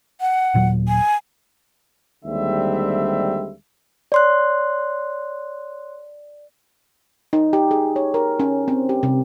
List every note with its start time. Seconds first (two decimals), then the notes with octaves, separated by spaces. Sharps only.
0.21 F#5
0.54 D#1 A#2 F#3
0.88 G#5
2.25 D#2 D3 G3 G#3 C4 E5
4.12 C#5 D5 C6 F#6
7.33 D#4
7.53 G4
7.71 G#4
7.96 C#5
8.14 A#4
8.40 C#4
8.68 C4
8.89 G4
9.03 C3